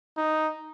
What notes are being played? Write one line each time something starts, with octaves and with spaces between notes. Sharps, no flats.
D#4